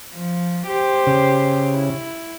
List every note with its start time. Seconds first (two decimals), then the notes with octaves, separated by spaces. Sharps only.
0.15 F3
0.68 G4 C5
1.07 C#3
1.70 E4